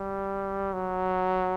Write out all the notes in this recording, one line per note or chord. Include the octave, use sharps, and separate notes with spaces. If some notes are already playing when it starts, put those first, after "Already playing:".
Already playing: G3
F#3